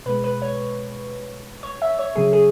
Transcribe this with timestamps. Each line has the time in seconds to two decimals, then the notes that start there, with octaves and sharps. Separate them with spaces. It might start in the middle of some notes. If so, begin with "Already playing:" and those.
0.06 B2 G#3 B4
0.24 B4
0.42 C#5
1.63 C#5
1.82 E5
1.99 C#5
2.15 C#3 F#3 G#4
2.33 G#4